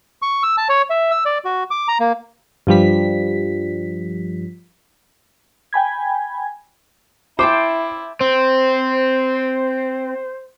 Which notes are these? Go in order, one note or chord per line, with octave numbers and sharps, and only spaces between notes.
C#6
E6
A5
C#5
E5
E6
D5
F#4
D6
A#5
A#3
G2 F3 G3 B6
G5 G#5 B5 G#6
E4 C5 G5 A5 D6
C4 C5